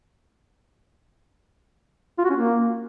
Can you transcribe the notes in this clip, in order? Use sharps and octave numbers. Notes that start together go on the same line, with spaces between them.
F4
F#4
C#4
A#3